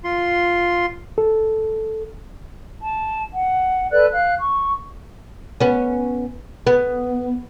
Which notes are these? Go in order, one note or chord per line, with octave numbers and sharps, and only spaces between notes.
F4 C6
A4
A5
F#5
A4 B4 D5 F#6
F5 F#6
C#6
B3 C#4
B3